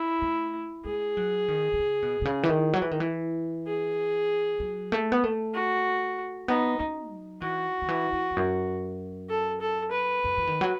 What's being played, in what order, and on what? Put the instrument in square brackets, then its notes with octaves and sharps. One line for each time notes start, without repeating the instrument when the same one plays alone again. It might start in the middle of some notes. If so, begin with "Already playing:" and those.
Already playing: [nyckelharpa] E4
[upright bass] A3
[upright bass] G#3 [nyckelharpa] G#4
[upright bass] F#3
D#3
D#3
C#3
B2
B2
C#3
E3
D#3
F#3
E3
D#3
E3
[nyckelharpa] G#4
[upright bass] F#3
A3
B3
A3
[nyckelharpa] F#4
[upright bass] B3 [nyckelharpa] D#4
[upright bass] C#4
F#3
[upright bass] E3 [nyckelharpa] F#4
[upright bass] D#3
E3
E3
E2
F#2
[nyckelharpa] A4
A4
B4
[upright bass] F#2
E3
D#3
F#3